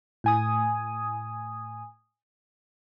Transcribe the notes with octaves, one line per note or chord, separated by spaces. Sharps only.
A2 G#5 D#6